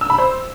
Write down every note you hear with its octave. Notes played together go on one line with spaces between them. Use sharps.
E6
B5
C5